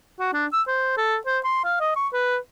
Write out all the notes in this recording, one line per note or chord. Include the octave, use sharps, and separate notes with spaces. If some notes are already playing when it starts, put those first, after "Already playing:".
F#4
D4
E6
C5
A4
C5
C6
F5
D#5
C#6
B4